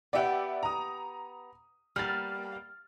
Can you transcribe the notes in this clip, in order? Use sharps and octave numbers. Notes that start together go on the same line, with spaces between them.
B3 G4 D5 E5 F#5
A#5 D#6
G3 A#3 B3 F6 A6